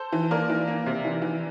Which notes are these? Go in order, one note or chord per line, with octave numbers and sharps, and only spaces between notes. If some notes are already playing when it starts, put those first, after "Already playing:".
Already playing: A4 C5
E3
A#3 A#4 D5
E3
A#3
C3
E3
E3